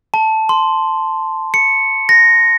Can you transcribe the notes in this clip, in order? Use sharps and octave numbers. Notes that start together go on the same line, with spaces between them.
A5
C6
C#7
A#6